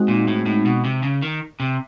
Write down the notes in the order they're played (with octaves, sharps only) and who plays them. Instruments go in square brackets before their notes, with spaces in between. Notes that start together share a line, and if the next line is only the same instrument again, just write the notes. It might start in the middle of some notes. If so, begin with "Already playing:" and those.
Already playing: [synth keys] G#3 C4 D#4 F#4
[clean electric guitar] A#2
A2
A2
B2
C3
C#3
D#3
C3